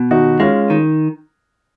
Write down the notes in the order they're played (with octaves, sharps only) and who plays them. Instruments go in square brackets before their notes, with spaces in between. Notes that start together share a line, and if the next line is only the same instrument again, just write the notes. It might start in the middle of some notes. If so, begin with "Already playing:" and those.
Already playing: [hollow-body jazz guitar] B2
[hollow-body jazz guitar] D#2 [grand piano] D#4 F#4
[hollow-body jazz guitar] G#3 [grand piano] C#4 F4
[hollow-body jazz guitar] D#3